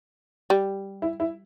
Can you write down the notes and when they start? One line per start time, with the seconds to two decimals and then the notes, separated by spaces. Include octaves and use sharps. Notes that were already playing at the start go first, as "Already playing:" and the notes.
0.50 G3
1.02 E4
1.20 E4